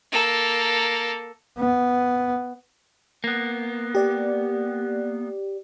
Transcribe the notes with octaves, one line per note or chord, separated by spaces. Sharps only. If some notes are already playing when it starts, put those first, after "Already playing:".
A#3 A4
B3
A#3 B3
G4 D5